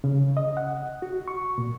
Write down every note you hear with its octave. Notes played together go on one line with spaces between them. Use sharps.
C#3
D#5
F#5
F#4
C#6
A#2